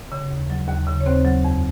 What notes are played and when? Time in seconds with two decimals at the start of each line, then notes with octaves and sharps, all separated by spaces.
0.12 C#3
0.31 D#2
0.50 F#3
0.68 D#2
0.87 C#3
1.00 C#5
1.06 D#2 C4 C5
1.25 F#3
1.44 F2